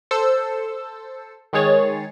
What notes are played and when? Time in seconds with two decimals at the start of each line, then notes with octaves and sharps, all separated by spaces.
0.11 A4 C5 E6
1.53 D#3 G#3 G#4 C#5 A6